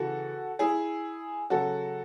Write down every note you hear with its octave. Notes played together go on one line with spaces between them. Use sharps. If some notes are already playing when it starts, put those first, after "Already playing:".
Already playing: C#3 E3 F#4 A4
E4 G#4
C#3 F#3 F#4 A4